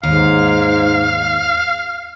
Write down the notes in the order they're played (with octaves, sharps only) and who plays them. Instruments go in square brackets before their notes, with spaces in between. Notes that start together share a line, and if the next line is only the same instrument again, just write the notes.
[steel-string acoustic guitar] D#2 [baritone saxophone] G#2 [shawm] F5